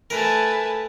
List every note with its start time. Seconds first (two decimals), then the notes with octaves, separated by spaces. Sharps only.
0.10 A3 A#4 B4 G#5 A5